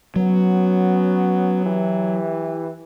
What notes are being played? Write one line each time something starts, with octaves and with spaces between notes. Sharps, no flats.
F#3 B3 C#4 F#4
E3 E4 G4